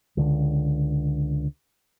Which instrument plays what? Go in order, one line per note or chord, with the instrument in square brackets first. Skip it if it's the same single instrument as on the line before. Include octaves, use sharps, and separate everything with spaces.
[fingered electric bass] C#2 D3